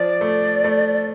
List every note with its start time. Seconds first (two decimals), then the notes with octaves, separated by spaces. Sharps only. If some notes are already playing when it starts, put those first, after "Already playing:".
Already playing: F3 D5
0.21 A3
0.64 A3